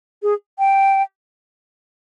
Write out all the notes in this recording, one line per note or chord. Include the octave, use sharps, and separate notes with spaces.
G#4
G5